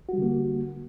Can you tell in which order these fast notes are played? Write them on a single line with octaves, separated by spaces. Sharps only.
F#4 G3 D3 A#3